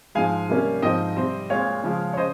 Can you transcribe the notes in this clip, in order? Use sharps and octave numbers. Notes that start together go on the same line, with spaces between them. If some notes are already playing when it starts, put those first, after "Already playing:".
G#2 F3 G#3 F5 G#5
C3 G3 A#3 C#4
G#2 F3 C4 D#5 G5
C3 G3 C4
A#2 G#3 C4 C#5 F5
C#3 F3 G#3 C#4
C#5
C#3 C5 D#5